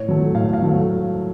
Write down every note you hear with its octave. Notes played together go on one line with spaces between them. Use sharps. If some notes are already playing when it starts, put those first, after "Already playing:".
Already playing: A2 C#5
F#3 A3
A2 F5
F5
F#3 A3